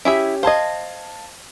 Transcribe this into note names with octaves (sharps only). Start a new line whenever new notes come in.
C#4 E4 G4 G#4 E5
C5 D#5 F5 A5 G#6